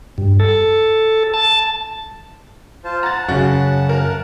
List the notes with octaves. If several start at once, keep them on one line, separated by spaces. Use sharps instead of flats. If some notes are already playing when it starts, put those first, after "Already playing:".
G2
A4
A5
F4 C5 A5
F#5 A5 A#5 A6
F#2 C#3 F#4
A#4